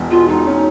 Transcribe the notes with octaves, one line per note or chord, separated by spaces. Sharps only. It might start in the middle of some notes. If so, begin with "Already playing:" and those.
Already playing: E1 E2
B2 F4
E1 D#4
C#4